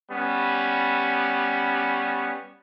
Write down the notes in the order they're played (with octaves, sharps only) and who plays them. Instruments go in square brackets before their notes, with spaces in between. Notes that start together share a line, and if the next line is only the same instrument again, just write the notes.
[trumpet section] G3 B3 C#4